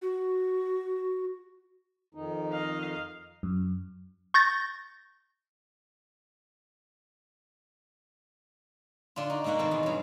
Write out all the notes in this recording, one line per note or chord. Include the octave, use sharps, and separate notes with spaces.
F#4
F2 D#3 D#4
D#5 F5
F#2
C#6 G6 A6 A#6
D3 D4 F4
D#4 F#4
G#2 C3 A#3 F#4 F#5
B2 D#3 C4 A4
E2 G#4
G2 F#3